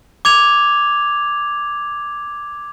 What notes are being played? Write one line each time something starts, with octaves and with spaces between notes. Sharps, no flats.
D6 G#6 F7